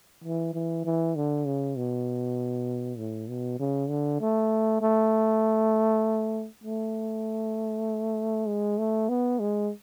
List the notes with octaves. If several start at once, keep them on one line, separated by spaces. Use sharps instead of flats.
E3
E3
E3
D3
C#3
B2
A2
B2
C#3
D3
A3
A3
A3
G#3
A3
B3
G#3